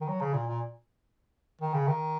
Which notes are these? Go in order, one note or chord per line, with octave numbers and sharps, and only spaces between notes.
D#3
F#3
C#3
A#2
A#2
D#3
C#3
D#3